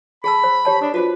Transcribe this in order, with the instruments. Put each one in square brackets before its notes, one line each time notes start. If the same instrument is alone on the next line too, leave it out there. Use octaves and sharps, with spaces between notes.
[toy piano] G#4 A5 E6 [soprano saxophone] B5
[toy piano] C5
G4 C#5 A5
[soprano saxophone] D4 [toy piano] D#6
[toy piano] F4 F#4 C5 [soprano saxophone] B4